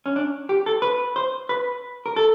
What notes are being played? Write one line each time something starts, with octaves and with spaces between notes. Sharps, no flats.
C#4
D4
G4
A4
B4
C5
B4
A#4
A4